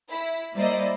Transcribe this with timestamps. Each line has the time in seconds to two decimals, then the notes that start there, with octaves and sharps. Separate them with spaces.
0.10 E4 B6
0.55 G3 A#3 E4 C5 D5 D#5